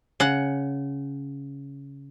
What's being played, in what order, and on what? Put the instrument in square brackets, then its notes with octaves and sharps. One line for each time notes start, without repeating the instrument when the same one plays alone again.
[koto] C#3 F#5